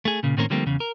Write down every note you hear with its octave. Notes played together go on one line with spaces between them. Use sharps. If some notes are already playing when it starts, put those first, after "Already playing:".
A3 G#4
A#2 C#3
A2 D#3 A#3 C4 C#4 A#4
D3 F3 G3 A3 A#3 C4
E2 C#3
A#4